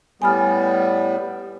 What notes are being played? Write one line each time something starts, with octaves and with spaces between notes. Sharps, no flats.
A2 G3 B3 G#5 B5 F6